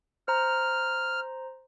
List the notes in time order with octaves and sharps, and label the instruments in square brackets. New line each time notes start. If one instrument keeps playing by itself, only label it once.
[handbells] C5 A#5 [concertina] F6